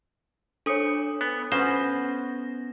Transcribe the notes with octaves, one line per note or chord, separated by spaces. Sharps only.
D4 A4 C#5 D#6 C#7
B3
B3 C#4 C5 A#6